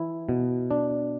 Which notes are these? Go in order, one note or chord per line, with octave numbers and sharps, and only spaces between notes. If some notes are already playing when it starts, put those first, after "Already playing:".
Already playing: E3 E4
B2
D4